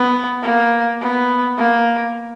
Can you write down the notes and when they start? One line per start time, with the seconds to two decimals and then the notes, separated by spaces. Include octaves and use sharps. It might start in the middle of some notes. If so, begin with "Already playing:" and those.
Already playing: B3
0.43 A#3
1.00 B3
1.58 A#3